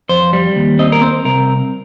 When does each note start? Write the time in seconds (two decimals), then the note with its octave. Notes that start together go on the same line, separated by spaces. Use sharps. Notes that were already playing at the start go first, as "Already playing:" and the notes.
0.09 F2 C5
0.33 G3
0.56 D#2
0.79 C4 D#5
0.92 A#4
1.01 C4 C5
1.25 C2 A#4